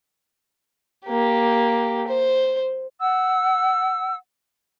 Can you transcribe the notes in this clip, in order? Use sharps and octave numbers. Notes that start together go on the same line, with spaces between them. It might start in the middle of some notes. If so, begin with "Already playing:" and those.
A#3 G4
C5
F#5 E6